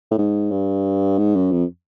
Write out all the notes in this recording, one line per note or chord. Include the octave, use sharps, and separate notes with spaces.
A2
G#2
G2
G#2
F#2
F2